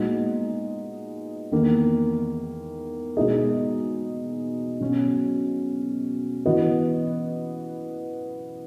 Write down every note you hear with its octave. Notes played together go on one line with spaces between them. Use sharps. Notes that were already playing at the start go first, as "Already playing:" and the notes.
Already playing: A#2 G#3 B3 D#4 F#4
E2 D#3 A#3
B2 G#3 D#4 G#4 D#5
B2 F#3 C#4
E3 B3 F#4 B4 D#5